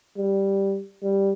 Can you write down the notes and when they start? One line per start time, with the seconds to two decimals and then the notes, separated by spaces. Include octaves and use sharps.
0.17 G3
1.03 G3